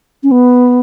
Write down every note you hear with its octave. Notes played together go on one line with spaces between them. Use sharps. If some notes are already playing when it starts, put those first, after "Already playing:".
C#4
B3